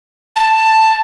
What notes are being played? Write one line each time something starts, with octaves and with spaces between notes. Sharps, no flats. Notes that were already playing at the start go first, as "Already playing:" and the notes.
A5